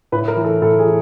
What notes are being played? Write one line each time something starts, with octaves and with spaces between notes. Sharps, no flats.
A2 B4
A#4
E3
A4
A2 A4
G#4
E3